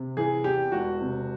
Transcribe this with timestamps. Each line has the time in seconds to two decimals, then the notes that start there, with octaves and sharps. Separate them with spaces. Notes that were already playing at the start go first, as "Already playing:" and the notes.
Already playing: C3
0.17 E3 G#4
0.44 E2 G4
0.72 E1 F#4
1.01 C3